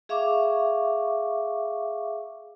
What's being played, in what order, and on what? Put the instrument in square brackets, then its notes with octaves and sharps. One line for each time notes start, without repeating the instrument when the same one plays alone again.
[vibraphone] G#4 E5 F5 C#6 D6